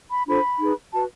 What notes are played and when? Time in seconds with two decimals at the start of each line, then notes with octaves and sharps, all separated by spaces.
0.10 B5
0.26 D4 F4 A4 C5 B5
0.59 D#4 G#4 B4
0.92 F#4 B4 A5